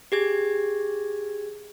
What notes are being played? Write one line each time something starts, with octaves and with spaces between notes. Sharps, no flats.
G4 G#4 G#6